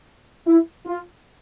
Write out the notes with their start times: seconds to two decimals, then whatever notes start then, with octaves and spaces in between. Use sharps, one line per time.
0.47 E4
0.86 F4